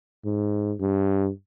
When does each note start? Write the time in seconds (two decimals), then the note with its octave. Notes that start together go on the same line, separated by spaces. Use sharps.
0.25 G#2
0.80 G2